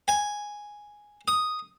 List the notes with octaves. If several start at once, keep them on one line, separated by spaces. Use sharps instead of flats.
G#5
D#6